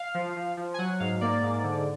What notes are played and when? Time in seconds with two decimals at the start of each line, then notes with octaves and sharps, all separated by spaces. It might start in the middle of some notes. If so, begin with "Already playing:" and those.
Already playing: F5
0.14 F3
0.36 F3
0.57 F3
0.74 G#5
0.79 F#3 F#5
1.00 G#2 F5
1.21 A#3 D5
1.43 G#2
1.64 D3